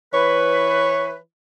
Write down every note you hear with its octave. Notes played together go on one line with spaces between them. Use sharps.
E3 B4 C#5